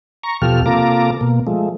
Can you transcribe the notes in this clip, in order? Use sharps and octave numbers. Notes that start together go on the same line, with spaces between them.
A#5 C#6
E2 B2 F3 G4 A4 F6
C3 A#3 F4 A4 A#5 D6
B2 A#3
F3 G#3 A3